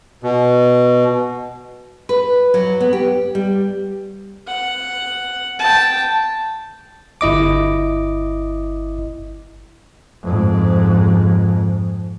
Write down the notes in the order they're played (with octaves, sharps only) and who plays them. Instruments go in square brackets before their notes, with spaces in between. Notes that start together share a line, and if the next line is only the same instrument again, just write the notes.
[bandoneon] B2
[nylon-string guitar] B4
F#3
B3
G4
G3
[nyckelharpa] F#5
G5 A5
[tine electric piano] G1 E4 D#5 D6
[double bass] F2 G#2